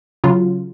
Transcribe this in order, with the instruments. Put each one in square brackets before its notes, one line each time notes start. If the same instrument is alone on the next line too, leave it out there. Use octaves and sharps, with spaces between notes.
[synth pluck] C#3 F#3 F4